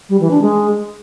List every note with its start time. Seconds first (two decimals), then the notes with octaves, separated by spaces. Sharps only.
0.09 G3
0.20 E3
0.31 D4
0.42 G#3